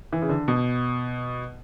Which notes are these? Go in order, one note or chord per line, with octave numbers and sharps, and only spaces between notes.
E3
C#3
D3
B2